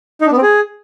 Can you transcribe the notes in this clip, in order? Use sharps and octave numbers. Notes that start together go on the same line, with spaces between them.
D#4
D4
B3
C4
G#4